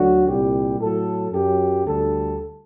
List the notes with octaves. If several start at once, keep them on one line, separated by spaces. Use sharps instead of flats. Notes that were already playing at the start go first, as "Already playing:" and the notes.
Already playing: D2 D3 F#3 F#4
C2 A#2 G3 G4
A2 F#3 A4
F#2 F#3 G4
D2 D3 G3 A4